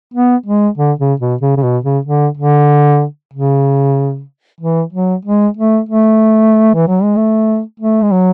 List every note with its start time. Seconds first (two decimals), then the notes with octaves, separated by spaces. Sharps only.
0.14 B3
0.46 G#3
0.78 D3
0.99 C#3
1.20 B2
1.41 C#3
1.57 C#3
1.63 B2
1.84 C#3
2.05 D3
2.38 D3
3.33 C#3
4.61 E3
4.93 F#3
5.25 G#3
5.57 A3
5.89 A3
6.75 E3
6.88 F#3
7.03 G#3
7.16 A3
7.80 A3
8.02 G#3
8.11 F#3